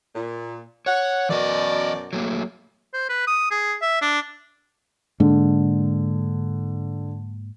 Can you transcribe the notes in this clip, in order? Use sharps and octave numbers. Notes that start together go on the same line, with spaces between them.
A#2
C#5 F#5
F#2 B2 E3 D5 D#5
F#3 A3 A#3
C5
B4
D#6
G#4
E5
D4
G#2 D3 G#3 A#3